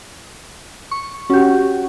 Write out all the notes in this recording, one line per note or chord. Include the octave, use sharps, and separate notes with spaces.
C#6
C#4 F#4 G4